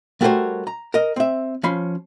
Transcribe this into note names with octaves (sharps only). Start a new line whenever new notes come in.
G3 A3 F#4 A#4 C5 C#5
A#5
A#4 D#5
C4 E5
F3 C#4 B5 C6